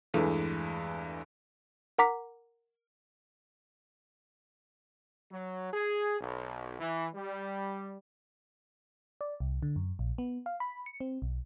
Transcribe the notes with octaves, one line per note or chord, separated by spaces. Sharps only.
E2 G2 E3 G#3 A3
A#4 F#5 A#5 D6 B6
F#3
G#4
B1
E3
G3
D5
C2
D3
F#2
A#1
B3
F5
B5
C#7
C4
B1